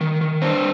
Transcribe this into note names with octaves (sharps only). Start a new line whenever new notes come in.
D#3
D#3
C4 D4 C5